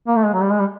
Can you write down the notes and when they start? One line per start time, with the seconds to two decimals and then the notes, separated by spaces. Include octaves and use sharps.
0.08 A#3
0.16 A3
0.25 G#3
0.34 F#3
0.42 G3
0.51 G#3
0.60 G3